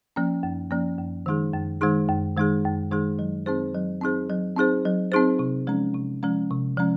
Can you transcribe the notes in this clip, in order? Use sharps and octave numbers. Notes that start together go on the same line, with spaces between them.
F3 A#3 C#4
F#2
F3 A#3 C#4
F#2
D#3 G#3 D#4 G#4
F#2
D#3 G#3 D#4 G#4
F#2
D#3 G#3 D#4 G#4
F#2
D#3 G#3 D#4 G#4
F#3
C4 D#4 G#4 C5
F#3
C4 D#4 G#4 C5
F#3
C4 D#4 G#4 C5
F#3
C4 D#4 G#4 C5
C3
F3 G#3 C#4
C3
F3 G#3 C#4
C3
F3 G#3 C#4